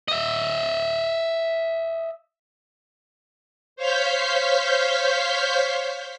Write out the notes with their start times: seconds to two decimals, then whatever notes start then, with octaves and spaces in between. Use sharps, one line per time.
0.08 D#5 E5
3.76 C5 C#5 F5 F6 G6 B6